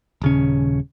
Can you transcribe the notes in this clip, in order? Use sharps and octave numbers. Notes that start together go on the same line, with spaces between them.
D#1 C#3 C#4